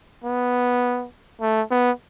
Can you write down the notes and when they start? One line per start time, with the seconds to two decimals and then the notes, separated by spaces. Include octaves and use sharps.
0.24 B3
1.41 A3
1.70 B3